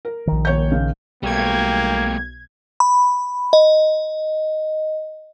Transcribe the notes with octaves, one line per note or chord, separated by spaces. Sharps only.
A#4
A#1 D#3
D#1 C#5 G6
C#3
B1 G3 A3 A#3 G5 G#6
B5
D#5